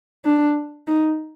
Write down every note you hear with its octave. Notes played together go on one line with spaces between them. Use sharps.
D4
D#4